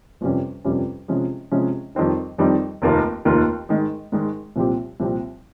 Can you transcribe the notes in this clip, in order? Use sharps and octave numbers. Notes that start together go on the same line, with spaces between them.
G1 F2 C3 G3 C#4
G1 F2 C3 G3 C#4
C3 F3 G#3 C#4
C3 F3 G#3 C#4
F2 D#3 G3 C4 D#4
F2 D#3 G3 C4 D#4
F1 D#2 D#3 A#3 F4
F1 D#2 D#3 A#3 F4
G#2 D#3 G#3
G#2 D#3 G#3
C2 A#2 F3 C4 G4
C2 A#2 F3 C4 G4